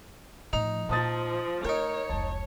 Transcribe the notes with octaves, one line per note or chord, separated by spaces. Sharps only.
A2 F3 D#4 F7
A#2 F3 A5 D#6 A6
A3 D#4 A#4 C#5 G5
F1 C#2 A5